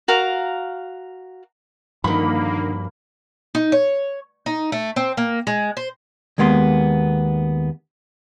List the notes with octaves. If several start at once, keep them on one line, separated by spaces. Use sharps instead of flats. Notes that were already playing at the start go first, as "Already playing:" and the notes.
F#4 A#4 F5 A#5
G2 D3 D#3 F3 A#3 B5
D#4
C#5
D#4
A3
C4
A#3
G#3
C5
D#2 G#3 A#3 B3 C6